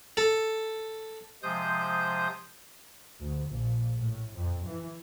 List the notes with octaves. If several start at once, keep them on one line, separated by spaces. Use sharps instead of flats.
A4
C3 F3 G#3 C5 D#6 G6
D2
A#1
A2
F2
E3